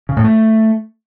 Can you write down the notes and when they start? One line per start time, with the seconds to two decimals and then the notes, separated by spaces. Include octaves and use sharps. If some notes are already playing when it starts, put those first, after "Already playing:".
0.09 C#3
0.16 A2
0.24 A3